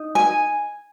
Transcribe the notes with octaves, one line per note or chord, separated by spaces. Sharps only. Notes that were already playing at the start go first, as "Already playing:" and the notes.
Already playing: D#4
G#5